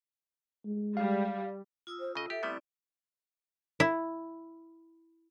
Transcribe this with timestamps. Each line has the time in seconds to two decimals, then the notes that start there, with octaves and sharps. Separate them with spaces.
0.65 G#3
0.97 G3 F5
1.87 F4 D#6 E6
2.00 C5
2.15 C#3 A4 D#5
2.30 G4 A4 E5
2.43 G3 A3 B3 C4 E4 D5
3.80 E4